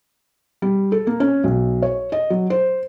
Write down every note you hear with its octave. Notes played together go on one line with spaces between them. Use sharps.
G3
A4
A#3
C#4
B1
C#5
D#5
F#3
C5